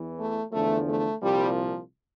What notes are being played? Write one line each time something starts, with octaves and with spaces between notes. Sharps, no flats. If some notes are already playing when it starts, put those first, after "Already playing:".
Already playing: E2 E3
A3
E2 D3 F3 A3
A3
C2 A#2 F3 G3